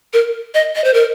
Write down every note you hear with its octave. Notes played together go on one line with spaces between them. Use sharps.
A#4
D#5
D#5
C5
A#4